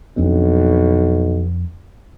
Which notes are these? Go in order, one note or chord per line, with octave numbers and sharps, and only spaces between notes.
B1 F2 C4 D4